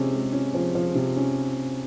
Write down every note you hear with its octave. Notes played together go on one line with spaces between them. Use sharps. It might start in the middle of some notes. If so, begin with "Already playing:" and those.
Already playing: C3 F3 G#3 C#4
G#3
C#4
F3
F3
C3
C#4